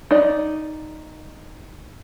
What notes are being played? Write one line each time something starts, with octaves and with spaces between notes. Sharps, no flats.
D#4 D5